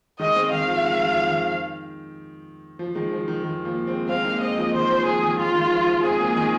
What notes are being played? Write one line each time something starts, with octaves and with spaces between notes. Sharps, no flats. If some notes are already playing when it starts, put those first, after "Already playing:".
D#3 G#3 D#5
G#3 C4
D#3 F5
F3
D#3 G#3
F3
D#3
F3
D#3 G#3
F3
D#3
D#3 G#3
F3 A#3
G#3 C4
G#3 C4 F5
A#3 D#4
G#3 C4 D#5
F3 A#3
D#3 G#3 C5
F3
F3 G#4
D#3 G#3
D#3 G#3 F4
D#3 G#3
F3
F3
G#3 C4 G#4
F3 A#3
D#3 G#3